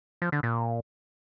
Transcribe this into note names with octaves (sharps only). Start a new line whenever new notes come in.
F3
D3
A#2